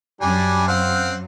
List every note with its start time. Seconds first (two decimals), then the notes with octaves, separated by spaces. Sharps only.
0.21 F#2 G3 D4 G#5
0.68 C4 F5 F#5